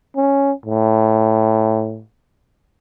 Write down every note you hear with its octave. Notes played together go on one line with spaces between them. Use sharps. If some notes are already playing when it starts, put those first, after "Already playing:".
C#4
A2